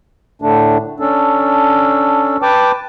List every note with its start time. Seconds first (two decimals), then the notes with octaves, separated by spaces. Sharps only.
0.42 A2 D3 A3 D4
1.00 C#4 D4 A4
2.42 B4 G5 A5 D6